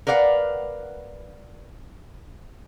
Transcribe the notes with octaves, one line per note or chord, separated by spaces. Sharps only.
A#4 B4 D5 F5 F#5